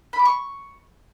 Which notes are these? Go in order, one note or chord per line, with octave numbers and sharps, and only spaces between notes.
B5
D6
C#6